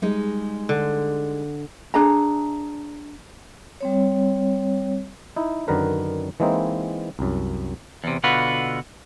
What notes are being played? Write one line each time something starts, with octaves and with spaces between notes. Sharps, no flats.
G3 G#3 D#4
D3
D4 G#4 E5 A#5
G3 C4 C#5
D#4 E4
F#2 D3 D#3 A#4 B4
E3 G#3 A#3 C4 D#4 E4
C2 F#2
E2 C3
B2 D3 F4 F#4 B4